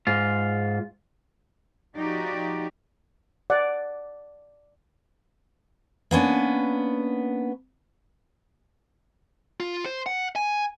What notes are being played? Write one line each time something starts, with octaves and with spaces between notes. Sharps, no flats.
G#2 F4
F3 D#4 F#4 G4 D5
D5 F#5
A#3 B3 C#4 D4
F4
C5
F#5
G#5